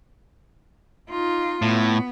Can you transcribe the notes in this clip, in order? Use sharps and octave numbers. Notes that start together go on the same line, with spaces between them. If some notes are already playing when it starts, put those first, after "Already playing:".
D#4 F4
A2 B3